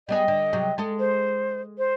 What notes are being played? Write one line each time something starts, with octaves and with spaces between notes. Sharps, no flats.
G3 B3 G#4 D#5
D3
C3 F#3 G#4
G#3 A4 D#5
C5
C5